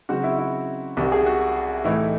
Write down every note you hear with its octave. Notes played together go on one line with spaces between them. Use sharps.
C#3 F#3 C4 D#4 F#4
E4
E4
C2 C3 D#3 F#4
G#4
F#4
A2 E3 A3 D#4 E4